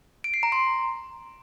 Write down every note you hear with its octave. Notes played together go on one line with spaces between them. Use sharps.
D7
C7
A#5
C6